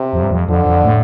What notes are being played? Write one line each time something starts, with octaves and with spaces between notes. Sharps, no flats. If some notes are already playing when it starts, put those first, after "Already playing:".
Already playing: C3
F2
G2
F2
F2 D3
F2
A2